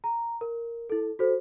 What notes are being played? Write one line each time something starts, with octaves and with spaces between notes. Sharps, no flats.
A#5
A#4
E4 A4
F#4 A4 C5